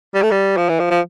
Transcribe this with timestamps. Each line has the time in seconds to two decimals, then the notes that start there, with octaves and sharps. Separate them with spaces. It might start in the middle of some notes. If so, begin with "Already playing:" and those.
0.15 G3
0.23 A3
0.31 G3
0.57 F3
0.69 E3
0.80 F3
0.91 F3